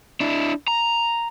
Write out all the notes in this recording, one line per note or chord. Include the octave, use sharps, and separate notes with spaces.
D4 E4
A#5